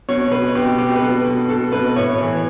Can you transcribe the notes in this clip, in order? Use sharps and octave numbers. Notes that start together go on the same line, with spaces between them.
B2 C#5
B2 B4
B2 G4
B2 G4
B4
B2 A4
B2
B2 A4
B2 B4
A2 C#5
E3